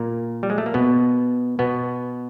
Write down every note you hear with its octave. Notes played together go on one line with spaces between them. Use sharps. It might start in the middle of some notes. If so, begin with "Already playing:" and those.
Already playing: A#2 A#3
G3
G#3
A3
A#3
B2 B3
B2 B3